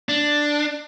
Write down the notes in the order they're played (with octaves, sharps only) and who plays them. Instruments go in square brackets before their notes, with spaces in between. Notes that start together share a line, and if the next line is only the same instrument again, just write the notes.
[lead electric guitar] D4